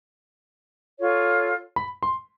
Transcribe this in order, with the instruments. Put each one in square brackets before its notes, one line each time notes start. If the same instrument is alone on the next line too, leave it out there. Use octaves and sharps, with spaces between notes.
[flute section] F4 A4 C#5
[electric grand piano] B5
C6